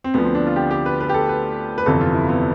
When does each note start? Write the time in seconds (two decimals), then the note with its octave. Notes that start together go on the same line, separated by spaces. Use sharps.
0.04 C4
0.14 D2 D3 F3 B3
0.25 C4
0.35 D4
0.47 F4
0.56 G4
0.71 G4
0.86 B4
1.01 B4
1.09 G4
1.14 A4
1.29 B4
1.78 B4
1.86 G1 F2 C3 E3 A4
2.01 F4
2.15 E4
2.29 B3